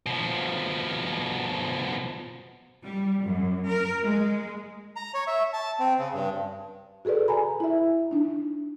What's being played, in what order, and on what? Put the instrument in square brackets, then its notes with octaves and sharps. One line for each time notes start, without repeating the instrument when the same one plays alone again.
[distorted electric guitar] B2 F3
[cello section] G3
F#2
A#4
G#3
[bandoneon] A#5
C#5
E5
A5
C4
C#3
G2
[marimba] F#4 G#4 A4 B4 D5
G#5 A#5 B5
E4 E5
D4 D#4